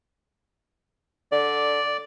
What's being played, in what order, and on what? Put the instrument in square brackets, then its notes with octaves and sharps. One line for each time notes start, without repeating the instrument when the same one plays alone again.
[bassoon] D3 [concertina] D5